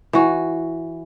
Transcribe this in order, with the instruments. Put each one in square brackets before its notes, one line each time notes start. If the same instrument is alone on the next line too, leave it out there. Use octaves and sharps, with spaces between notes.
[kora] E3 F#4